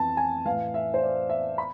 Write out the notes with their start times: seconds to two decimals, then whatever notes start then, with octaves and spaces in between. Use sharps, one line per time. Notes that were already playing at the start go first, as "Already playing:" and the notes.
Already playing: F2 E3 A5
0.17 G#5
0.45 A2 E3 F5
0.74 E5
0.94 C5
1.02 D5
1.29 E5
1.58 B5